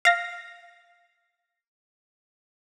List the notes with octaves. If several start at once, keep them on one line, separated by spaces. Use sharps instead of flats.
F5 A#6